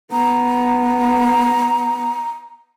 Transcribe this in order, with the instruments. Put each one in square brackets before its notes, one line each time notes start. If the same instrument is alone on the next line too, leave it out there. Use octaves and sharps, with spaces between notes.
[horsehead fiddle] B3 [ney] A#5